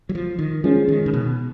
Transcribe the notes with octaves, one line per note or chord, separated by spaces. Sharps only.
F#3
F3
D#3
F3 G#3 C#4 G#4 C#5
D#3
C#3
B2